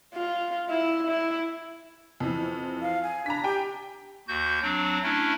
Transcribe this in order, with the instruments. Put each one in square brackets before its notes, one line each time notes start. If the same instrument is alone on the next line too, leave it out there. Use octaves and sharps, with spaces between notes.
[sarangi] F4
E4
E4
[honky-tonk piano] F2 E3
[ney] F5
G#5
[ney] D4 [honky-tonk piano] A#5 B6
[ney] G4 [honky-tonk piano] G5 G#5
[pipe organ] D#2 F#4 G6
F#3 C4 D4
A3 C#4 D4 E4